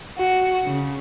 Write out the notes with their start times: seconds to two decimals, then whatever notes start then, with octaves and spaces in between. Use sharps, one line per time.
0.19 F#4
0.65 C#3